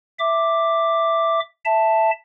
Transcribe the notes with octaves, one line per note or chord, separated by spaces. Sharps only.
E5 D6
E5 A5